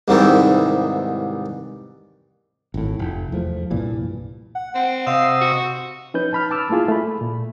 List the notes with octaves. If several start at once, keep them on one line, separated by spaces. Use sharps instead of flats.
C2 G#2 D#3 E3
G#1 A2
F1
E2 F3 A3
C2 G2 A#2 E3
F#5
C4 F#5
C3 D#5 F5 E6
F#4
F3 C#4 D#4 B4 G6
A5 B5 F6
A5 D6 E6 F6
A3 A#3 E4 F4 G#4
A3 B5
A#2